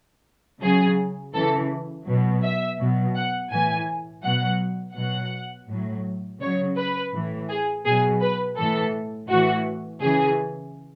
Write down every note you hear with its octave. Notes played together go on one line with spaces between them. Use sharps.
C#3 F#3 G#4
C#3 E3 A4
B2 F#3
E5
B2 F#3
F#5
A2 E3 G#5
B2 F#3 F#5
B2 F#3 F#5
A2 F#3
C#3 F#3 C#5
B4
A2 E3
G#4
B2 F#3 G#4
B4
A2 E3 A4
A2 E3 F#4
C#3 E3 G#4